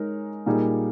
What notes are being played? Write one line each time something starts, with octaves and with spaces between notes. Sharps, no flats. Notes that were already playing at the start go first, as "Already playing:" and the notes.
Already playing: G#3 D#4 A#4 C#5
A#2 G3 A#3 D#4 G#4